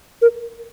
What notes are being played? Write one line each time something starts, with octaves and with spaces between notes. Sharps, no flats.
A#4